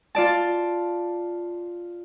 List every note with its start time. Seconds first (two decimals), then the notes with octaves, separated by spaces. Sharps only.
0.15 F4 D5 A5